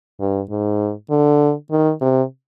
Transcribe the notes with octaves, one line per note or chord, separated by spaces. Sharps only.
G2
G#2
D3
D#3
C3